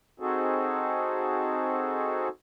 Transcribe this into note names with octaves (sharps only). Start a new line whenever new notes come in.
C4 D#4 F#4 G#4 A4